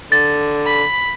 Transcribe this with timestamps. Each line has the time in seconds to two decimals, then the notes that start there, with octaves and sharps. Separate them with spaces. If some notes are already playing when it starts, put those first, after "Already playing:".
0.12 D3 A6
0.66 B5